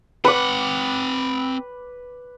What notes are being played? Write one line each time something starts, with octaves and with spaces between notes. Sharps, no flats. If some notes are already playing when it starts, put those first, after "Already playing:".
C4 B4 F#5 D6